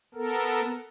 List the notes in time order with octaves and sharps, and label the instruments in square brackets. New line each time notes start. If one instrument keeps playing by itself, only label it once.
[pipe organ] B3 A4 A#4